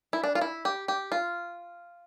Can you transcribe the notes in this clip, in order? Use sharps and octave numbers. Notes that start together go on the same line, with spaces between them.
E4
D4
F4
E4
G4
G4
F4